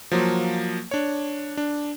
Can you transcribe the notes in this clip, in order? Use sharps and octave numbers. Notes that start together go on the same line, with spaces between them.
F3 F#3 A#3
D4 C#5
D4